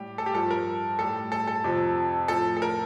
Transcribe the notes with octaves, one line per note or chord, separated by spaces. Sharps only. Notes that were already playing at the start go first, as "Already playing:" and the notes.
Already playing: A2 G3 G4
A4
G4
G2 F3 A4
A#4
A2 G3 A4
A4
A4
F2 C3 F3
A2 F3 A4
A4
A#4